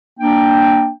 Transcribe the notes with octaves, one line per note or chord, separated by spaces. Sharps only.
A#3 D4 G5